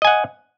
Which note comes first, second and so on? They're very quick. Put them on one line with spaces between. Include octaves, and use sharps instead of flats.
D#5 G#5 F#5